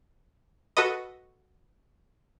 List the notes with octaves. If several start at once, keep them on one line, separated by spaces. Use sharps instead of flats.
F#4 A4 B4 D#5